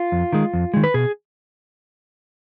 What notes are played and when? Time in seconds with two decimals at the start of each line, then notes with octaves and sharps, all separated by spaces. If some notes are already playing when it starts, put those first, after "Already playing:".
Already playing: F4
0.12 F2
0.33 D#3 G#3
0.54 F2
0.74 D#3 G#3
0.84 B4
0.94 B2 G#4